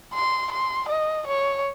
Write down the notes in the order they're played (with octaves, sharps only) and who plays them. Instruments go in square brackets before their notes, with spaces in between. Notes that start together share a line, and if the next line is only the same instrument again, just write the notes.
[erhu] C6
C6
D#5
C#5